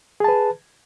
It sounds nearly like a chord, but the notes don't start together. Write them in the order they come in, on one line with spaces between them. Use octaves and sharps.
G#4 A5 B4